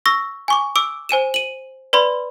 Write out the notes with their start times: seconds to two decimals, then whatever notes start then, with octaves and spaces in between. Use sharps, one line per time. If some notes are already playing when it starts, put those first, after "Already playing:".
0.06 C#6 E6 A#6
0.48 G#5 C#6 D6
0.76 D6 E6 D7
1.09 C5 G#5 D#7 E7
1.34 D#7 F#7
1.93 B4 D5 B5 C6